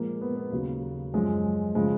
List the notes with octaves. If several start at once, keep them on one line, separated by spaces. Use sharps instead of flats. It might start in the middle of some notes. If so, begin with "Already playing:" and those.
Already playing: A#2 F3 G#3 A#3
B3
B3
D#2 C#3 F#3
F#2 F3 G#3
C#3 F3 G#3